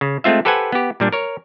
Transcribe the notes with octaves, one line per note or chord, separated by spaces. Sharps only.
C#3
G#3 A3 C4 F4 E5
G4 A4 B4 C5 F#5 G#5
B3 G4
A#2 G3 D4
A#4 C#5